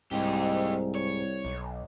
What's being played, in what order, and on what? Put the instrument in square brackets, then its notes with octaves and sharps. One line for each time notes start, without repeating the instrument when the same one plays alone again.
[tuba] C2 [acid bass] G#2 [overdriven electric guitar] D#4 G4
[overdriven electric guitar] C#5
[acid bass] B1